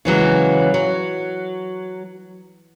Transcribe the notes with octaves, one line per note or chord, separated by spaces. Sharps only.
C#3 E3 F#3 G#3
F#3